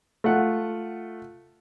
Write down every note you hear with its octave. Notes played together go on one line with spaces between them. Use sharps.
A3 F4 F#5